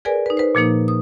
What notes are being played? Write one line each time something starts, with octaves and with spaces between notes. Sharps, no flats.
G#4 A#4 B4 D5 G#5
D#4 B4
B4 C5
A#2 F3 A#3 D#4
D#6